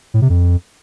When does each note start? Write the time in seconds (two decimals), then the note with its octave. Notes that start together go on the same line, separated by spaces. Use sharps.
0.14 A2
0.22 C3
0.30 F2